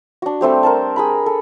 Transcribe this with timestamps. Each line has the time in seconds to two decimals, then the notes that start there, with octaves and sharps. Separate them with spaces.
0.22 D4 F#4
0.41 G3 A3 C4 G4
0.63 A#4 C5 A5
0.96 G#4 A#4 B5
1.26 A4